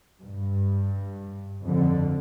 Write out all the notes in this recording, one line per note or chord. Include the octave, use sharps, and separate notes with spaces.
G2
F2 D3